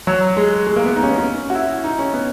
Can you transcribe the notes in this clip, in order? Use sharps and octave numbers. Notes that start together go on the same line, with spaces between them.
F#3
G#3
G#3
A#3
B3
D#4
C#4
B3
C#4
F#4
E4
D#4
C#4
B3